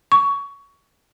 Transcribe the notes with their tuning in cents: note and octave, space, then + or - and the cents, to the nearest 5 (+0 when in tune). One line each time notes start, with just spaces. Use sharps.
C#6 +20